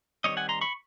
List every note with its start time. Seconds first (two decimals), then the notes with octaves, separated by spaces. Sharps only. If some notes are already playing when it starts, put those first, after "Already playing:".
0.24 D#3 G3 C4 C#5 D#5
0.37 F#5 G#5
0.49 A#5 C6
0.61 B5 C#6